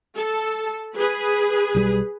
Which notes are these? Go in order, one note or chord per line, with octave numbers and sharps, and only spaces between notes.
A4
G#4 B4
B1 F3 G3